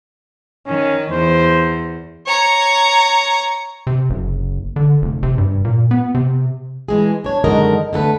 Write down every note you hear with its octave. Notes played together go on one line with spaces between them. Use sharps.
D#3 C#4
E2 C5
C#5 A#5
C3
F#1
D3
F1
C3
G2
A#2
B3
C3
E3 G#3 G#4
D4 C#5
F#2 D3 D#3 G#3 A#4 D#5
D3 A3 A4 B4